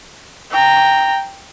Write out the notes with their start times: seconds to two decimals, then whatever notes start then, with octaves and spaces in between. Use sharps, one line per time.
0.52 G5 A#5